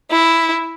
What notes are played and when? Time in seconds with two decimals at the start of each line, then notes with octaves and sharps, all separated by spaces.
0.11 E4